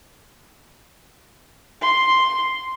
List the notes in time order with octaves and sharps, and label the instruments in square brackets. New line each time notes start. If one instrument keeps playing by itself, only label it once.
[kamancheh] C6